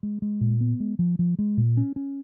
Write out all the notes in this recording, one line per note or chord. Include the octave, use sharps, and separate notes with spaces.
G#3
G#3
A#2
B3
G#3
F3
F3
G#3
A#2
C#4
C#4